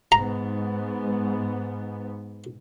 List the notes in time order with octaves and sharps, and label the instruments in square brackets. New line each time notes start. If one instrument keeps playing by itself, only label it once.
[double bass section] G#2 B3 [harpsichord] A#5